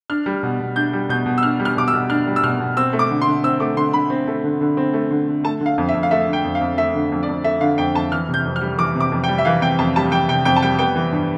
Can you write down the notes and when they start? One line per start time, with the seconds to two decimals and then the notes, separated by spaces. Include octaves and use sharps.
0.10 D4 F6
0.26 G3
0.43 B2
0.60 B2
0.76 D4 G6
0.93 G3
1.09 B2 G6
1.26 B2
1.38 E6
1.43 D4 F6
1.60 G3
1.65 F6
1.77 B2 D6
1.88 E6
1.94 B2
2.10 D4 F6
2.27 G3
2.36 E6
2.43 B2 F6
2.60 B2
2.77 C4 E6
2.93 A3
2.99 D6
3.11 D3
3.22 C6
3.27 D3
3.44 C4 E6
3.60 A3 D6
3.77 D3 C6
3.93 D3 B5
4.10 C4
4.27 A3
4.44 D3
4.61 D3
4.77 C4
4.93 A3
5.11 D3
5.28 D3
5.44 A3 A5
5.61 D3
5.66 F5
5.78 F2
5.89 E5
5.94 F2
6.03 F5
6.11 A3 E5
6.28 D3
6.33 G5
6.45 F2
6.55 F5
6.61 F2
6.77 A3 E5
6.95 D3
7.12 F2
7.23 D5
7.28 F2
7.44 A3 E5
7.61 D3 F5
7.78 F2 G5
7.95 F2 A5
8.12 E3 F6
8.29 C3
8.34 G6
8.45 F2
8.56 F6
8.61 G3
8.78 E3 D6
8.95 C3 D6
9.12 F2
9.24 G5
9.28 G3
9.38 E5
9.45 E3 F5
9.62 C3 G5
9.79 F2 A5
9.96 G3 A5
10.12 E3 G5
10.29 C3 G5
10.45 F2 G5
10.56 A5
10.62 G3 G5
10.79 B3 G5
10.96 E3
11.12 G2